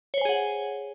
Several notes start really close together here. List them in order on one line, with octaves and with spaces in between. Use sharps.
C#5 C5 G#5 G#4 F#5